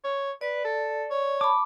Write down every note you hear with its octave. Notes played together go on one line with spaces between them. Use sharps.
C#5
B4 D5
A4
C#5
A5 B5 D6